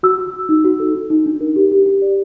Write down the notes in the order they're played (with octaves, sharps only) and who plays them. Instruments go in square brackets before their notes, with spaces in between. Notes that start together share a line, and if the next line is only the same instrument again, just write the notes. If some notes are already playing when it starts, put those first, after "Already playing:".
[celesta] F#4 E6
F#4
F#4
D#4
F#4
A4
D#4
D#4
D4
A#4
G4
G4
G4
D5